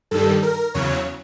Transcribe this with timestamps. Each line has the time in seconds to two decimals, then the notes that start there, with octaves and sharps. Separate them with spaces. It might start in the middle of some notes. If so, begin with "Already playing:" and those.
0.11 G2 D#3 G3 A4
0.43 A#4
0.74 E2 C#3 F#3 C#5